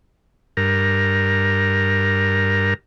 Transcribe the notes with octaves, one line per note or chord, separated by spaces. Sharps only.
G2 A#4